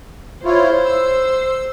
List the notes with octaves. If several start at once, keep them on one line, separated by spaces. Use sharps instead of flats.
E4 F4 C5 C#5
E6